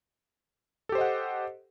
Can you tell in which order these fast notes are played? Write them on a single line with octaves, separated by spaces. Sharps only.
A4 G4 C5 D#5 F#5